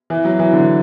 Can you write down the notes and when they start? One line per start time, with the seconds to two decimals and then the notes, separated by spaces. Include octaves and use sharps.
0.10 E3
0.25 F#3
0.39 E3
0.53 D3